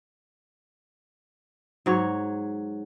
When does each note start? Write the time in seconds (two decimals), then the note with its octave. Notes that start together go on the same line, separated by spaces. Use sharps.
1.86 G#2 F#3 C#5